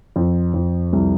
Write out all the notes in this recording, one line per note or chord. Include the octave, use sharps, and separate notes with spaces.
F2
F2
C2